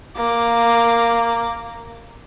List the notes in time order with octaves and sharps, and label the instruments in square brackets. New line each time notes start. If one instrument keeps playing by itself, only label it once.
[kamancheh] A#3 D6